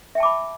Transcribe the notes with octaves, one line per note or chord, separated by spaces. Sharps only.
E5 G5 A5 B5 D6